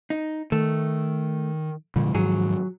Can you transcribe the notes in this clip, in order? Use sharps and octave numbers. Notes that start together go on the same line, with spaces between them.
D#4
D#3 A3
C2 F2 A#2 D3 G#3
G#2 D#3 F3 F#3 G#4